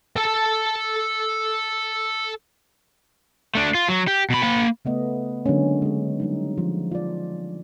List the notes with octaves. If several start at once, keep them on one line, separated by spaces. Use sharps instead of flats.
A4 A5
A3 D4
F4
F#3
G4
B2 B5
A#3 B5
C#3 A3 B3 D#5
D3 F#3 G#3 A#3 C#4
G#3 G#4
F#3 G3 D#4
F3
F4 D5